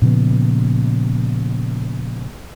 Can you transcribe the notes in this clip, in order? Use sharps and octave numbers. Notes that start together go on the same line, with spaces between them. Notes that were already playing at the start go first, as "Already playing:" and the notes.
A#2 C#3 F3 B3